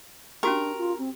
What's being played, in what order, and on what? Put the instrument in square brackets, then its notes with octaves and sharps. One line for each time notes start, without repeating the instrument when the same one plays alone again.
[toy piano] C#4 F#4 G4 [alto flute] D4 [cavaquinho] A#4
[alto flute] F4
C4